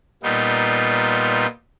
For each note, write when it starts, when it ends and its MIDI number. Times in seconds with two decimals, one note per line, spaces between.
0.23 1.46 46
0.23 1.46 55
0.23 1.46 59
0.23 1.46 63
0.23 1.46 65